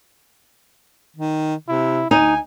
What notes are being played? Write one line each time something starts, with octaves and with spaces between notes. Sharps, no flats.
D#3
C3 E4
D2 D#4 G#5